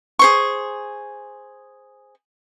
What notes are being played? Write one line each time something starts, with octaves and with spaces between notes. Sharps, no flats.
G#4 C5 C#6